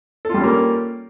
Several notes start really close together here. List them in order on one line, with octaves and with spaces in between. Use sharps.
A4 F4 G3 C#4 A#3